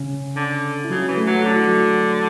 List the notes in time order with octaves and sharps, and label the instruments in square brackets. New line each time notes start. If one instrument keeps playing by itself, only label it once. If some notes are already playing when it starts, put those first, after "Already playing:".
Already playing: [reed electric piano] C#3 C#4
[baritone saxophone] D3
[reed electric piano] E4
[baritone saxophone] C#3 [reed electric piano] F#3 F#4
[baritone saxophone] E3
[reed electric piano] A3 A4
[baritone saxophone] F#3
[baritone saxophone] D3 [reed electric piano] F#4
[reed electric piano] E4
F#3 F#4